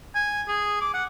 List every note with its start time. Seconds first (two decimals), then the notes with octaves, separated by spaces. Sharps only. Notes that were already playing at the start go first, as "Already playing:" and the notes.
0.15 G#5
0.48 G#4
0.81 D6
0.94 F#5